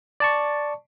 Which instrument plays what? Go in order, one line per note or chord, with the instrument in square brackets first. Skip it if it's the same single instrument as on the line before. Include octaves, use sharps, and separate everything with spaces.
[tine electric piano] D5 A5 C#6